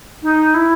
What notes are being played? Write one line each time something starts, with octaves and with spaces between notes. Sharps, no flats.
D#4
E4